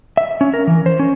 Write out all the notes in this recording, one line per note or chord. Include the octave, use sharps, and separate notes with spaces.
E5
C#4
A#4
E3
C5
C#4